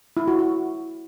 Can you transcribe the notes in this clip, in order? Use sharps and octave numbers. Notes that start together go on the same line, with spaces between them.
E4
F#4
F#4